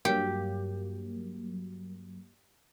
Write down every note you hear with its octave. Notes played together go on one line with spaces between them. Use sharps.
G2 F#3 A#3 G4